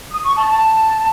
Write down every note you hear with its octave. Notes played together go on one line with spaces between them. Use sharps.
D#6
C#6
A5
A5